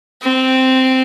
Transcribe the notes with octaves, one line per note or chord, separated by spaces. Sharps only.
C4